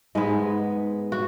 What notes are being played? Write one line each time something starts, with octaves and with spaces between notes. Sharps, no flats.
G#2 G#3 B3
F#4